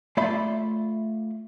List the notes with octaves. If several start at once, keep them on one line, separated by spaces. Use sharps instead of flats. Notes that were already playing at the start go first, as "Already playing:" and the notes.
A3 F4 D5 E5 B5 C6